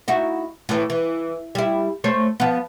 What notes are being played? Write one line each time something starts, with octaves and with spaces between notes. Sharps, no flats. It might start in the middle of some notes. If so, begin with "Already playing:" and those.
D#4 E4 F#4
A2 E3
E3
G3 E4
A3 C5 C#5
F3 B3